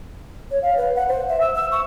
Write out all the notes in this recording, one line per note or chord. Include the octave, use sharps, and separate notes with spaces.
C#5
F5
B4
F#5
C5
E5
E6
E6
C#6